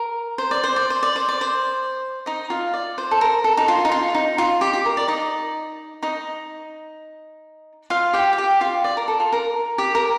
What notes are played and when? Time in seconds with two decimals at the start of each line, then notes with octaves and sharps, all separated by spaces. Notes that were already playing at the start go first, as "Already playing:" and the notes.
Already playing: A#4
0.38 C5
0.51 D5
0.64 C5
0.76 D5
0.90 C5
1.03 D5
1.16 C5
1.29 D5
1.41 C5
2.26 D#4 D#5
2.50 F4 F5
2.74 D5
2.98 C5
3.11 A4
3.21 A#4
3.44 A4
3.57 D#4
3.68 F4
3.85 D#4
3.92 F4
4.15 D#4
4.38 F4
4.61 G4
4.73 G4
4.86 A#4
4.97 D5
5.08 D#4 D#5
6.03 D#4 D#5
7.90 F4 F5
8.13 G4 G5
8.33 F5
8.38 G4 G5
8.61 F4 F5
8.84 D5
8.97 A#4
9.08 A4
9.20 F4
9.33 A#4
9.78 G4
9.95 A#4